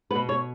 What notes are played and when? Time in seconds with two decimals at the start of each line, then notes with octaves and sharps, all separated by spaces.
0.11 B2 B3 B4
0.29 C#5